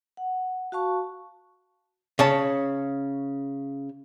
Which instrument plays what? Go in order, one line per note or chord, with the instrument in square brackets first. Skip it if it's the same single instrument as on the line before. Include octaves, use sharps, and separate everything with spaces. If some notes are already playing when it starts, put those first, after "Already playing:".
[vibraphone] F#5
F#4 F5 A5 C#6
[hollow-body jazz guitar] C#3 C#5 A5